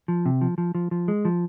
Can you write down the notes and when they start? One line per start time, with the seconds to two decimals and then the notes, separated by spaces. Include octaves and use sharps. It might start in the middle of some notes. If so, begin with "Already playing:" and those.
0.08 F3
0.26 C3
0.41 F3
0.58 F3
0.75 F3
0.91 F3
1.08 G#3
1.25 F3